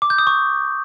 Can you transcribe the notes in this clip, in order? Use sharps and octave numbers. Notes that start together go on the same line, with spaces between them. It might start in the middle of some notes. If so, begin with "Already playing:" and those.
D6
G6
D#6
C#6